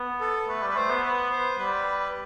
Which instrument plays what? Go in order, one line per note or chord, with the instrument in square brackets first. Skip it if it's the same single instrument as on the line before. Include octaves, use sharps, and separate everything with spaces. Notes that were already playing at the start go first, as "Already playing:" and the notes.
Already playing: [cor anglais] B3
[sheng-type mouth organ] A4
[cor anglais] A3 [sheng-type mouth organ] B4
[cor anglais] G3
[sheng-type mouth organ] B4
[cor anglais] A3 [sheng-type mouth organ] C5
[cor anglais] B3
[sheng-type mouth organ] B4
C5
[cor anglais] G3 [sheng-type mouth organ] B4